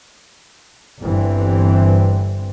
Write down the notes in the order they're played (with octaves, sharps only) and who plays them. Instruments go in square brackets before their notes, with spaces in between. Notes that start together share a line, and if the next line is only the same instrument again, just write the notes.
[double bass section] G1 G2 E3 C4